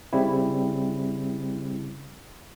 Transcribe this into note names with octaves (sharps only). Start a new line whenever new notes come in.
C#3 G3 C4 E4